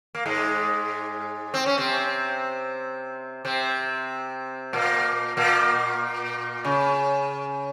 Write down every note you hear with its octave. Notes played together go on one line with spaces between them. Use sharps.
A#3
G#2 G#3
C4
C#4
C3 C4
C3 C4
A#2 A#3
A#2 A#3
C#3